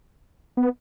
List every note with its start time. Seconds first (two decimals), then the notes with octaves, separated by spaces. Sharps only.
0.57 B3